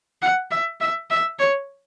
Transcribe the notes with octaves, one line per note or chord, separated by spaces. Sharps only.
F#5
E5
E5
E5
C#5